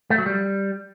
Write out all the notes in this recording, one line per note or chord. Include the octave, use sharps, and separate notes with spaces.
A3
F#3
G3